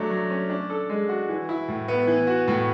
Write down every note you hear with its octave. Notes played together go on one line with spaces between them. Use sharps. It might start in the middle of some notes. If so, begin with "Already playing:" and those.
Already playing: F#3 A3 D4
F#3
C#4
D4
A4
G#3
F#4
E3
E4
A2
B3
E3
F#4
A2